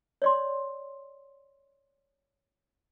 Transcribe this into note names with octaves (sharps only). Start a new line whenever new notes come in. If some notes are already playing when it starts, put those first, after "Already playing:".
C#5 D5 C6